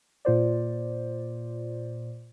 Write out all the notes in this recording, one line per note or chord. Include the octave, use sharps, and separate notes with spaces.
A#2 F4 C5 D5